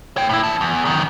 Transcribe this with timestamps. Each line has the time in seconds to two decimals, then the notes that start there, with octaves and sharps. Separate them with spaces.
0.17 C#5 G5
0.30 A2 E4
0.43 E3 A5
0.61 E2
0.85 F#2 D#3